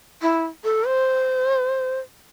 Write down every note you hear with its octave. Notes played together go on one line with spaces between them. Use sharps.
E4
A4
C5